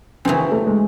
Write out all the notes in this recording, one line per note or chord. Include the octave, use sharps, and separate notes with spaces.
F#2 C#3 E3 C4
A3
G#3